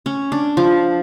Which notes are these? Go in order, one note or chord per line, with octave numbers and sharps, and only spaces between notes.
C#4
D4
F3